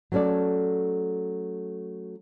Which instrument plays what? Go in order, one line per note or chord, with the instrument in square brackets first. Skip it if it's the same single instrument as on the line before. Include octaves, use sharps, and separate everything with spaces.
[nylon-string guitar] F#3 A3 C#4 A4 D5